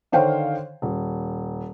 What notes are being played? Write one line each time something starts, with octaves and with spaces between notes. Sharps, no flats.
D3 D#3 C5 C#5 F5 G5
D#1